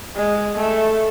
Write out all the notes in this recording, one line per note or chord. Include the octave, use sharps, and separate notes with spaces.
G#3
A3